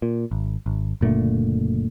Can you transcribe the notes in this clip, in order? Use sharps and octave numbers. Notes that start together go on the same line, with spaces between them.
A#2
G#1
G#1
F#1 A#2 D3 A3